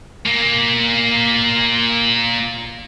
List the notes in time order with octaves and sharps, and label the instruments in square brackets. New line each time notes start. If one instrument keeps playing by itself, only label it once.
[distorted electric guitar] A#2 A#3